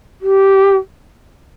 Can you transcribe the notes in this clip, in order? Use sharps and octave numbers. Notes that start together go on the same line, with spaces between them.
G4